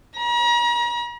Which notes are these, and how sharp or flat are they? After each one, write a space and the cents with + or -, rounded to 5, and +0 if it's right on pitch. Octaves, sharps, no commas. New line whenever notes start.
A#5 +40